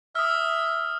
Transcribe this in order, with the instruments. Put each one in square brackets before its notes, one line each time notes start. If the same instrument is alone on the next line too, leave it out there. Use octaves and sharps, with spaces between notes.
[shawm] E5 [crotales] D#6 F6